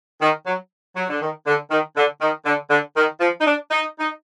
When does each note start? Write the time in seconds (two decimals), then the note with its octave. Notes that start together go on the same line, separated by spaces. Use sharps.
0.22 D#3
0.46 F#3
0.96 F#3
1.10 D3
1.22 D#3
1.47 D3
1.71 D#3
1.97 D3
2.21 D#3
2.46 D3
2.71 D3
2.97 D#3
3.21 F3
3.41 D#4
3.47 D4
3.71 D#4
4.00 D#4